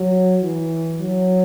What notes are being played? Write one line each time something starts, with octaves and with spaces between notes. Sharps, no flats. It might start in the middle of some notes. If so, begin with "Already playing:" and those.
Already playing: F#3
E3
F#3